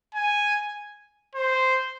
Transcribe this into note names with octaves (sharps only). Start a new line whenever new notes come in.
G#5
C5